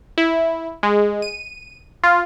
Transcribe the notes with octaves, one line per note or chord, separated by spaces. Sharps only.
E4
G#3
D#7
F4